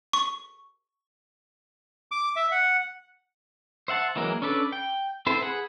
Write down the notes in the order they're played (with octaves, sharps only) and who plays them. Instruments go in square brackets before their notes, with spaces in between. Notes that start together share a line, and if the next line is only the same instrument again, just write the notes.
[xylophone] C#6
[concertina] D6
E5
F#5
[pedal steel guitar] C5 E5 F#5 A5
E3 F#3 G#3 A#3 A#4
C#4 D4 A4 B4 D5
G5
C4 E4 A4 B4 C5
G#4 B4 F#5